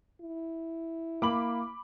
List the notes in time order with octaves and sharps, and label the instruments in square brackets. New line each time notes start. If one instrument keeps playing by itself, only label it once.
[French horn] E4
[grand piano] A#3 F#7 [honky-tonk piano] B5 D6